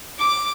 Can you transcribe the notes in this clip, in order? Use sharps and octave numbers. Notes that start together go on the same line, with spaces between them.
D6